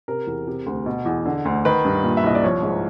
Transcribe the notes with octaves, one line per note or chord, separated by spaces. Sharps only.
C3 A#4
E2
C3
D2
B2
E2
D3
D2
D#3 B4
G2
A#2
E5
C2 D#5
D5
F3 C#5
G#2